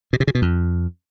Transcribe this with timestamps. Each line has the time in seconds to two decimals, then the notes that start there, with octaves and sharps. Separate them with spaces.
0.13 B2
0.20 C3
0.27 C#3
0.35 B2
0.42 F2